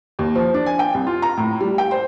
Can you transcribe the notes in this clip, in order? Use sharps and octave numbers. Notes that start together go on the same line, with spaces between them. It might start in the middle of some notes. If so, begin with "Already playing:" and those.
D#2
F3
D4
G#5
G5
C2
F4
A#5
A2
G3
G5
C5